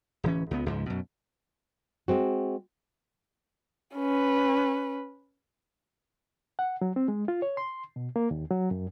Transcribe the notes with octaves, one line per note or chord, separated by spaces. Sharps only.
D1 E3 C#4
C#2 B3
C#2 G#2 F3
F#2 B2
G#3 C4 F#4
C#4 B4
F#5
F#3
C4
G#3
F4
C#5
C6
B2
A#3
D#2
F#3
F#2